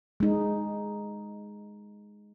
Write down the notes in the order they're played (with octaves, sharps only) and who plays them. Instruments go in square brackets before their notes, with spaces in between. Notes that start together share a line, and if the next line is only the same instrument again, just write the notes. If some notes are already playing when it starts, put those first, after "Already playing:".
[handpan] G#3 D#4